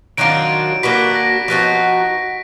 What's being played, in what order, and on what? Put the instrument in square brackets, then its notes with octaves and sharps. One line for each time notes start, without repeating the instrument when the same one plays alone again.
[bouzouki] D#3 F#3 D4 F4 [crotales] D7
[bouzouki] A#3 D4 F#4 B4 [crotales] B6
[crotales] A#6
[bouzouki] F3 B3 D#4 F#4